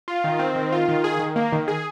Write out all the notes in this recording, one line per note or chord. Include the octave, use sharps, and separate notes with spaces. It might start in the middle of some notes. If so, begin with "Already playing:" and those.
F4
D#3
C4
D#3
F4
D#3
G#4
D#3
A#3
D#3
G#4